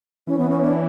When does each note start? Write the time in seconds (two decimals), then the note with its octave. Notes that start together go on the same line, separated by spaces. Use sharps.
0.27 E3 C#4
0.38 B3
0.50 C#4
0.62 D4